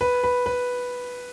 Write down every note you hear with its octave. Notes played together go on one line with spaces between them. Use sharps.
B4
B4
B4